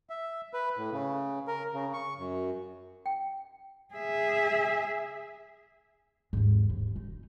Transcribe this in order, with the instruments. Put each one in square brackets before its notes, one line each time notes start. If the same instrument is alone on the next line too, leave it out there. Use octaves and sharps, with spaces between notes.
[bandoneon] E5
B4
A2
C#3
A#4
C#3
C#6
F#2
[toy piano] G5
[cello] G#4 E5
[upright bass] D#2 G#2
D#2
D#4